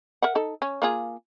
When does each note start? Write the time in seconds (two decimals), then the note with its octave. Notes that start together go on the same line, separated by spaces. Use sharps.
0.22 A#4 E5 F#5
0.35 D#4 A4
0.62 C#4
0.82 A#3 F4 G#4